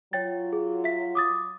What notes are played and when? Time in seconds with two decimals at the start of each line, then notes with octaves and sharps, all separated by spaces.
0.13 F#3 F4 C#5 G5 A6
0.53 G#4
0.84 E5 B6
1.15 D6 D#6 A6